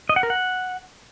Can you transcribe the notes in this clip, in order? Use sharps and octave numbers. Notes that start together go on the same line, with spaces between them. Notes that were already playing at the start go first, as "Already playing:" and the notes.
D#5
F#5
A#4
F#5